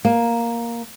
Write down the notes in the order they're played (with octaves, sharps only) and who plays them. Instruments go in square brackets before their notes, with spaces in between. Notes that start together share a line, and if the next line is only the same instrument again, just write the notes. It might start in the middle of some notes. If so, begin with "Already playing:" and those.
[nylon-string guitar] A#3